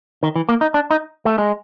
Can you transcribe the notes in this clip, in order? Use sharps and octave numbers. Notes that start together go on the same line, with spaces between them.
D#3
E3
A#3
D#4
D4
D#4
A3
G#3